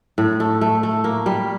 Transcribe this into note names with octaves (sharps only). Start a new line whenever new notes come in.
A2
A3
A3
A3
A#3
G3